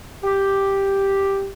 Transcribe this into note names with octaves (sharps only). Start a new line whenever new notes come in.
G4